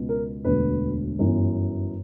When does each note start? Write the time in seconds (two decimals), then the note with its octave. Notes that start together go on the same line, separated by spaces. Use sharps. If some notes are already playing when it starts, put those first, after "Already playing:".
Already playing: C#2 B2
0.09 A#4
0.45 E1 D2 D3 B4
1.19 G1 F#2 E3